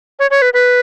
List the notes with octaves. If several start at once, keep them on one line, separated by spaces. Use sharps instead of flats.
C#5
C#5
B4
B4